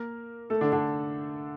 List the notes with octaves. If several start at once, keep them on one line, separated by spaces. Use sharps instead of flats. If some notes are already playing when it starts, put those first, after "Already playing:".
Already playing: A#3 A#4
A3 A4
D3 D4
D3 D4